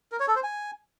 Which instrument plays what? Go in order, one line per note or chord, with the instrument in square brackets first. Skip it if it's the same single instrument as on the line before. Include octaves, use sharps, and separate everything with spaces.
[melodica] A#4
C#5
A4
C5
G#5